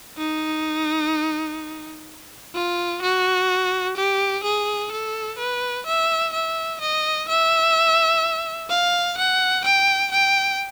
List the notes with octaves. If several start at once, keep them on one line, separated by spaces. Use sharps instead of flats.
D#4
F4
F#4
G4
G#4
A4
B4
E5
E5
D#5
E5
F5
F#5
G5
G5